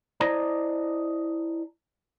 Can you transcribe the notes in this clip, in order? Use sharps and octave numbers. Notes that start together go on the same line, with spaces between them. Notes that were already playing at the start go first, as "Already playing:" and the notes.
E4 C5 D5 D#5 A5 A#5